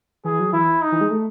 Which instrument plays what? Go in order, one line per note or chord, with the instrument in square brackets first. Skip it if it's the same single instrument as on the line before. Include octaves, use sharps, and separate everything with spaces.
[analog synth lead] E3 [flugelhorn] G#4
[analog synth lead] F#3
[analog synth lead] E3 [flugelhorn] E4
[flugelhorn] D#4
[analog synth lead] E3
G#3
A3